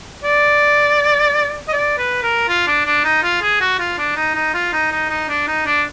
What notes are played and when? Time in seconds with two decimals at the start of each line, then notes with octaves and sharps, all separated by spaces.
0.24 D5
1.68 D#5
1.73 D5
1.98 B4
2.23 A#4
2.48 F4
2.67 D4
2.85 D4
3.04 D#4
3.23 F4
3.42 G#4
3.61 F#4
3.79 F4
3.98 D4
4.16 D#4
4.35 D#4
4.54 F4
4.73 D#4
4.92 D#4
5.10 D#4
5.28 D4
5.47 D#4
5.66 D4